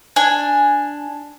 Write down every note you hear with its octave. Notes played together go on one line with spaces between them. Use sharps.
D4 G#5